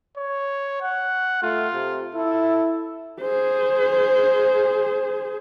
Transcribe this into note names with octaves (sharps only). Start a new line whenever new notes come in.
C#5
F#5
A3 F4
C3
E4 A4
G#4 C5